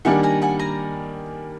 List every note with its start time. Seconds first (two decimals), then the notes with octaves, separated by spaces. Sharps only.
0.05 D#3 G3 A#3 D4 F#5 G#5
0.23 G#5 A#5
0.42 F#5 G#5
0.59 G#5 A#5